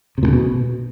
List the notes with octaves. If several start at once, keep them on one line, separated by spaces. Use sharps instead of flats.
C3
A#2
C#3
B2